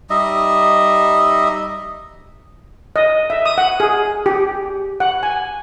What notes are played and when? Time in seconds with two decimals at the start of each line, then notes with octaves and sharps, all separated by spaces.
0.10 G3 D#4 D#5 E5
2.96 D#5
3.30 E5
3.46 D#6
3.58 F#5
3.80 G#4
4.26 G4
5.00 F#5
5.23 G#5